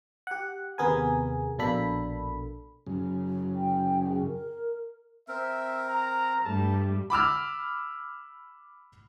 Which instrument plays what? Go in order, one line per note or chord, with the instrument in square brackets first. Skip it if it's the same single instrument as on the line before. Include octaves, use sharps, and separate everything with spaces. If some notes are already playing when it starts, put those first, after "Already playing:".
[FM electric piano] G4 F#5
D#2 C3 B3 G#4 A#4 G#5
A#1 B2 A#3 D4 A4 B5
[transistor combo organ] F#2 C#3
[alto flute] G5
G#4
A#4
[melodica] C4 A#4 [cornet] E5
[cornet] A#5
[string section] G2 G3 A3 [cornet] A5
[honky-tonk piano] B5 D6 E6 F6